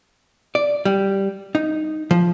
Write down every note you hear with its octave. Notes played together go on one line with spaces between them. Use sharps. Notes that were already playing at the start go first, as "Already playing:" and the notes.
D5
G3
D#4
F3